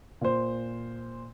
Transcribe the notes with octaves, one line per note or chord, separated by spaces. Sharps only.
A#2 C5